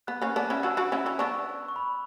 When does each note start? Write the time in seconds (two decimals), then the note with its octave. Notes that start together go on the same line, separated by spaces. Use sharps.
0.07 B3 F#6
0.21 A#3 C#4
0.36 B3 D4
0.50 C#4 E4
0.63 D4 F#4 E6
0.77 D4 F#4
0.92 C#4 E4
1.06 C#4 E4
1.19 B3 D4 C#6
1.68 C#6
1.76 B5